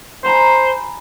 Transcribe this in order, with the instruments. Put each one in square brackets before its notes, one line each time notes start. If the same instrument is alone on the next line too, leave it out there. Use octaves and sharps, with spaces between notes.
[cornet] C5 [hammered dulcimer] G#5 A#5 B5